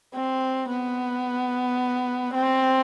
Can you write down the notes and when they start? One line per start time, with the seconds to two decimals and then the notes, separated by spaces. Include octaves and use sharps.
0.14 C4
0.69 B3
2.34 C4